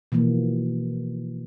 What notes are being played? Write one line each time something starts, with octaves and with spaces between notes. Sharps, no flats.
B2 E3 F3 A#3